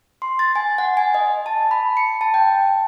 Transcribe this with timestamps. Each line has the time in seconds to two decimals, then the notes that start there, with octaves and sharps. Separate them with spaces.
0.22 C6
0.39 A6
0.56 G#5
0.78 F#5
0.97 G#5
1.14 D#5
1.46 A5
1.71 B5
1.97 C#7
2.21 A5
2.34 G5